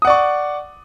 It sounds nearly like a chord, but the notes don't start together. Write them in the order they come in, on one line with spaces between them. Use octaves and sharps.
D#6 F#5 D5 C#6